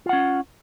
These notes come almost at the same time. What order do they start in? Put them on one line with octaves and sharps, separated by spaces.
F4 F#5 C#4